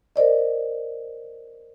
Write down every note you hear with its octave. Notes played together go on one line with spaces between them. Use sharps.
A#4 C5 D5 D#5